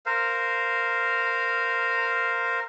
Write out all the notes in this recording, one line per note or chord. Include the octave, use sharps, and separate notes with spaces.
A#4 C5 F5